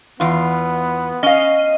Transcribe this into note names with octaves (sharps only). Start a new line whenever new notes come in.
E2 B3 F4
C#4 D#5 F5